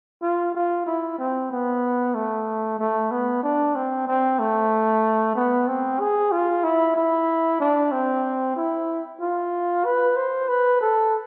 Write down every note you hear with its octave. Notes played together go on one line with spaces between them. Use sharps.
F4
F4
E4
C4
B3
A3
A3
B3
D4
C4
C4
A3
B3
C4
G#4
F4
E4
E4
D4
C4
E4
F4
B4
C5
B4
A4